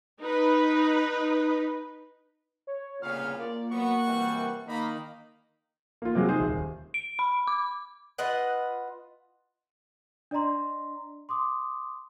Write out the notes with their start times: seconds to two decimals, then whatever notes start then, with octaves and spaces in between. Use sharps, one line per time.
0.22 D#4 B4
2.67 C#5
3.02 C2 A#2 C#3 B3 C#5 F5 F6
3.38 A#3 F4 D5
3.71 F#3 B3 F#4 F#5 C#6
4.06 C3 E3 G3
4.68 D#3 A#3 A#5 B5
6.02 A#3 F4
6.15 C3 F#3 G#3
6.29 D#4 G#4 C5
6.40 D#1
6.94 D7
7.19 B5
7.48 D6
8.18 F4 B4 D#5 F#5
10.31 D4 D5 D#5 A#5 C6
11.29 C6 D6 D#6